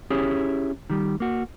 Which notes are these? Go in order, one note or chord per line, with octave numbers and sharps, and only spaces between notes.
C#4 E4 G4 G#4 C#5
D#3 G3
A#3 F#4